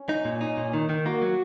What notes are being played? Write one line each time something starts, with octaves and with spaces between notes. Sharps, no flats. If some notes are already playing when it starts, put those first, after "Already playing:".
Already playing: C#4
D#4
A#2
D#4
A#2
D#3 D#4
D#3
A#3 F#4
F#3